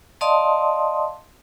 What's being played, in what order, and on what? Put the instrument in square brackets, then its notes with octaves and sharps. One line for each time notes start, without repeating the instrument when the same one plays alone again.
[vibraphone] D5 D#5 F5 A5 C6 D#6